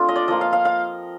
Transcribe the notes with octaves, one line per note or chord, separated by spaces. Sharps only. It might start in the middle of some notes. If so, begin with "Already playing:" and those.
Already playing: A3 C4 D4 F4
D#5
D5
F3 A#3 F4 D#5
F5
F5
F5